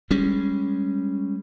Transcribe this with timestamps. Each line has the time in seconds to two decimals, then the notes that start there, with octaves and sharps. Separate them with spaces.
0.11 G3 G#3 C#4